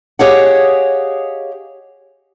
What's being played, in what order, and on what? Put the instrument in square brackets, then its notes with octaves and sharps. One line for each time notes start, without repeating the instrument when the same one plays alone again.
[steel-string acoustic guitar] G4 G#4 C#5 D#5 F5 F#5